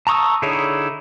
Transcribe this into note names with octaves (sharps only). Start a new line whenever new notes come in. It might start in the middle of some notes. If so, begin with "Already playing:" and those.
A5 A#5 C#6 D#6 E6
D3 D#4 E4 G#4 C#5